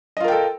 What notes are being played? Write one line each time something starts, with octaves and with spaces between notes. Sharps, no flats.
F4 A4 A#4 D#5 G5